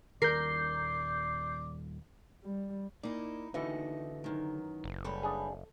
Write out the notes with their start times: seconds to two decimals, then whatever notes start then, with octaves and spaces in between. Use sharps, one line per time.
0.22 D#1 G#1 D#3 A#4 D5 G6 C7
2.44 G3
3.03 A#3 D#4 E4 D5
3.54 D#2 D3 E3 D#4 F#4 D#5
4.24 F#2 D#3
4.84 F#1
5.04 C#3 G3 A4 B4
5.23 D4 G#4